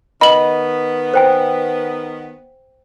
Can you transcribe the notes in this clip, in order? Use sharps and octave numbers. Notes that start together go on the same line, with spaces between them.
D#3 B3 D#5 B5 F#7
C5 G5 G#5